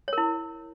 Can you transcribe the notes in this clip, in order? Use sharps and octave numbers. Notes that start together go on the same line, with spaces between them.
E4 A#4 C#5